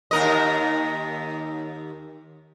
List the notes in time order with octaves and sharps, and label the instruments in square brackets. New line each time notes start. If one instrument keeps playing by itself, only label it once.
[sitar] D#2 A#4 D#5